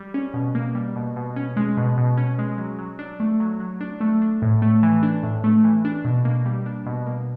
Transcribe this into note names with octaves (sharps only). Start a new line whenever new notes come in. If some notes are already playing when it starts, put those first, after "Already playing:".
Already playing: G3
C#4
B2
A#3
G3
B2
B2
C#4
G#3
B2
B2
C#4
G#3
F#3
F#3
D4
A3
F#3
F#3
D4
A3
D4
A2
A3
E3
D4
A2
A3
E3
D4
B2
A#3
G3
D4
B2
A#3